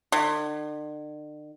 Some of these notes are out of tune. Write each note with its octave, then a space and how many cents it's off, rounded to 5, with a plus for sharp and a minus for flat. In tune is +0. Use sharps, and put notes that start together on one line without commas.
D3 +45